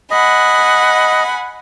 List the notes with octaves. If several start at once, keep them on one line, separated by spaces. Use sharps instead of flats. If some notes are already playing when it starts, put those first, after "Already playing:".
D#5 F#5 G#5 B5